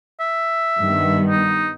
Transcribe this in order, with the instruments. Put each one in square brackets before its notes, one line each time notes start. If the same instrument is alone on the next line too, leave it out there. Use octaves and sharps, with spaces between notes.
[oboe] E5
[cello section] G2 D#3 B3
[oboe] D#4